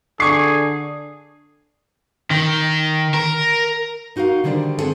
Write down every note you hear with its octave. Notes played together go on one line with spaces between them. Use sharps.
D3 G#4 C#6 D6 C7
D#3
A#4
G#3 D#4 F#4 A#4 F5
D3 D#3 G3 D4 C5
G#3 C4 G#4 A4